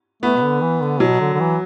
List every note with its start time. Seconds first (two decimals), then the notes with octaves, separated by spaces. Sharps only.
0.23 A3 B3
0.36 B2
0.42 D3
0.61 E3
0.81 D3
1.00 B2 F#3
1.20 D3
1.34 D3
1.40 E3